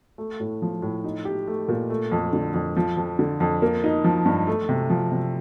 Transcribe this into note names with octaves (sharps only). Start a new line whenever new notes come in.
A3
A2
F3
A2
D#4
G4
A3
A#2
A3
F2
D3
F2
F3
F2
D3
F2
A#3
D#4
F3
G2
A3
C3
F3
C3